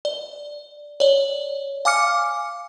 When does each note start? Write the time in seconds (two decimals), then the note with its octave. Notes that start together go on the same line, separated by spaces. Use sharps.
0.05 D5
1.00 C#5 D5
1.85 F5 G#5 D6 F6 C#7